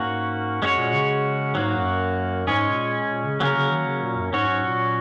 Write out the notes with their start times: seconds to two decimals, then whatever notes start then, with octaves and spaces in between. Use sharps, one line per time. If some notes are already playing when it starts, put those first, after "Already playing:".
Already playing: G#2 A#3 C#4 F#4
0.62 F#2 G#3 C#4 F#4 C#5
0.77 A#2
0.93 C#3
1.55 G#2 F#3 A#3 F#4
1.78 F#2
2.47 G#2 G#3 C#4 G#4 C#5
2.70 A#2
3.09 A#2
3.25 C#3
3.40 C#3 F#3 A#3 C#4 A#4
3.56 C#3
3.71 D#3
3.87 C#3
4.02 A#2
4.17 F#2
4.33 G#2 F#3 C#4 F#4 C#5
4.48 G#2
4.63 A#2